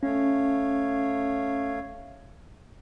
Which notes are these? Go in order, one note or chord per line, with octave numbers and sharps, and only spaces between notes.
A3 C#4 C#5 F5